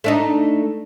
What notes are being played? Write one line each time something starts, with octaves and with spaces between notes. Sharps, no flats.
A3 D4 D#4